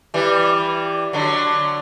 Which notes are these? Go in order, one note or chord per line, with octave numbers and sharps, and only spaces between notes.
E3 G3
D3 F#3